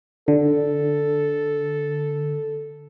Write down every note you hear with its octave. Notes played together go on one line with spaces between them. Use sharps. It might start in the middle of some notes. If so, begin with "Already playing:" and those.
D3 A4